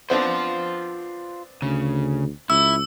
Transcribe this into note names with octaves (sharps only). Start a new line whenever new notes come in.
B3 C4 D4 F4 C5
D2 C#3
C#2 E4 E6